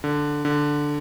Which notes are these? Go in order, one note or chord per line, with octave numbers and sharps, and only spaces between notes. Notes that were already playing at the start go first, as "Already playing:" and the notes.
D3
D3